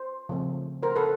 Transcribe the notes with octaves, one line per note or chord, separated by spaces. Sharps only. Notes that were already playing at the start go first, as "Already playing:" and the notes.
Already playing: C5
C#3 F3 A3 C4
A#4 C5
A4 B4